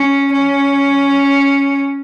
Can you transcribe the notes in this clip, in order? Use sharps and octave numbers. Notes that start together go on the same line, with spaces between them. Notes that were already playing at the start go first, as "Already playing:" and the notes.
Already playing: C#4
C#4